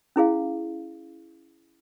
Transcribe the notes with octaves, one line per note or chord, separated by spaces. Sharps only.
C#4 E4 G#4 F5